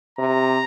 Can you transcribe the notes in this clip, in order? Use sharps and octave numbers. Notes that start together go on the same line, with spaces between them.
C3 A#5